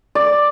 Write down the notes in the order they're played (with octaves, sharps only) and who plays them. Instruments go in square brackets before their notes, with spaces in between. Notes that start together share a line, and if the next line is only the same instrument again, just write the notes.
[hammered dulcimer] D5